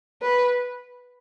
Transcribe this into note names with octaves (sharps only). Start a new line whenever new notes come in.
B4